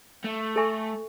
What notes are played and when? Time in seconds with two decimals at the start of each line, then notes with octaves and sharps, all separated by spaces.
0.24 A3
0.56 A4 E5 G#5 C#6